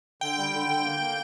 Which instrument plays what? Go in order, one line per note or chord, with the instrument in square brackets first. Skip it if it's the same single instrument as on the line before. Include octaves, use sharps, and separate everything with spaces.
[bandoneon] D3 [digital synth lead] G5
[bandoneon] G3
D3
D3
A#3
A#3